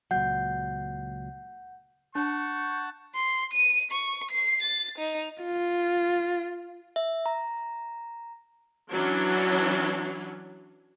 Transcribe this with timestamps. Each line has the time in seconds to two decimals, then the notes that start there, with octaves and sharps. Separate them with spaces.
0.11 C#2 A#2 F#3 F#5 G6
2.15 D4 F#5 A5 C#6 G6
3.15 C6
3.53 D#7
3.91 C#6
4.31 C7
4.62 A6
4.98 D#4
5.43 F4
6.96 E5
7.26 A#5
8.91 E3 F#3 C#4 D4